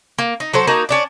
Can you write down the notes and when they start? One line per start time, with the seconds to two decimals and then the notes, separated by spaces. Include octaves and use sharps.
0.18 A#3
0.40 D#4
0.53 F#3 A4 C5
0.67 A#3 D#4 F#4 A5
0.89 C#4 D4 D5